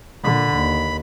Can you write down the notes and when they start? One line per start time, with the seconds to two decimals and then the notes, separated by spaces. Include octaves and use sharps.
0.24 A#2 D3 B5
0.55 D#2